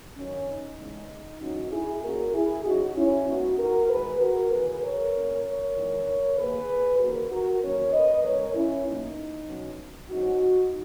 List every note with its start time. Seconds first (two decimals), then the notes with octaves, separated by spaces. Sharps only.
0.17 F#2 D#3 F#3 C#4
0.48 D#4
0.79 E2 C#3 G#3
1.41 F#2 C#3 E3 G#3 C#4 D#4 F#4
1.72 E4 G#4
2.03 A#2 A#3 C#4 F#4 A#4
2.34 E4 G#4
2.65 C#3 F#3 C#4 D#4 F#4
2.96 C#4 E4
3.27 A#2 G#3 B3 D#4 F#4
3.58 F#4 A#4
3.89 E2 D#3 G#3 G#4 B4
4.20 F#4 A#4
4.51 D#2 C#3 E3 G#4 B4
4.82 A#4 C#5
5.13 A#2 A#3 C#4
5.44 A#4 C#5
5.76 E2 D#3 G#3
6.37 D#2 D#3 A#3 G#4 B4
6.99 D#2 C#3 E3 A#3 F#4 A#4
7.30 F#4 A#4
7.61 E2 D#3 F#3 A#3 C#4 A#4 C#5
7.92 B4 D#5
8.24 E2 C#3 G#3 C#4 A#4 C#5
8.55 C#4 E4
8.86 B2 F#3 A#3 D#4
9.48 B2 F#3 C#4
10.10 G#2 F#3 C#4 D#4 F#4